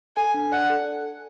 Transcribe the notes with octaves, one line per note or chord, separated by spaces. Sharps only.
A4 G#5
D4
D5 F#5
A4